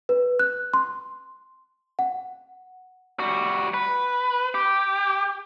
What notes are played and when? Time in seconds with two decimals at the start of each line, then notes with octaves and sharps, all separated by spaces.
0.09 B4
0.39 F#6
0.74 C6
1.99 F#5
3.20 G3 F#4
3.74 B4
4.55 G4